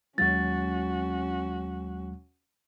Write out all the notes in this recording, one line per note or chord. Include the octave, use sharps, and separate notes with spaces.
D#2 F#3 G#3 C#4 F#4 A6